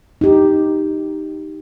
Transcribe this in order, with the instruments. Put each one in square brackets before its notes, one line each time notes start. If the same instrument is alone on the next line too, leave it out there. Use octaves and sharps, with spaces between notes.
[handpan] D#4 G4